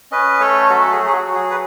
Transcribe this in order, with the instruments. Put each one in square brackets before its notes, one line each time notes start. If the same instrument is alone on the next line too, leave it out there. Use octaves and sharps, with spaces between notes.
[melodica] C#4 B4 D#5
A3 A4 C#5
F#3 F#4 A4
G#4
F#3
G#4
F#4
F#3
G#4
B4